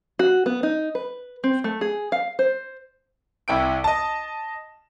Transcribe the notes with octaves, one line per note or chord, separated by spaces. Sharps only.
F#4
B3
D#4
B4
C4
A3
G#4
F5
C5
C2 E4 G5 D7
D#5 A5